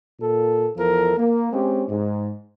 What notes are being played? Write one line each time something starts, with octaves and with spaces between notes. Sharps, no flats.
A#2 A4
E2 F3 A4 A#4
A#3
G#3 C4 C#4 G4
G#2